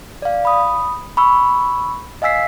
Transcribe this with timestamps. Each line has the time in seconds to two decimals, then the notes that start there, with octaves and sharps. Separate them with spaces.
0.22 D5 F5
0.45 B5 D#6
1.17 B5 C#6 E6
2.22 D#5 F5 G#5 E6 B6 C7